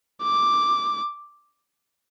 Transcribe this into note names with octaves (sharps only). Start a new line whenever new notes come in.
D6